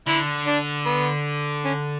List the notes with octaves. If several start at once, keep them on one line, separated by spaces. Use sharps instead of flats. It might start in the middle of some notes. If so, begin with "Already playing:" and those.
D3 E4
D4
B3
C#4